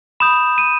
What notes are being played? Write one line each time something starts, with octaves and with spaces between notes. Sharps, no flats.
B5 D#6 G6 E7
D#7